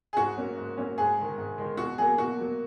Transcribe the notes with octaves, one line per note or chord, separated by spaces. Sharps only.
G#4
G#2 F#4
F#3 A#3 C#4
G#2
F#3 A#3 C#4
G#2 G#4
D#3 G#3
G#2
D#3 G#3
B2 F#4
F#3 A#3 G#4
B2 F#4
F#3 A#3